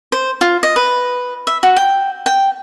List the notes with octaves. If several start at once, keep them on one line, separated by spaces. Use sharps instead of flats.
C5
F4
D#5
B4
E5
F#4
G5
G5